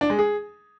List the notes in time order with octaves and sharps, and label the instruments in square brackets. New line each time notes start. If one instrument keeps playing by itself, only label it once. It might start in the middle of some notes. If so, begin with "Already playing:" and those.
[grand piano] D4
G#3
G#4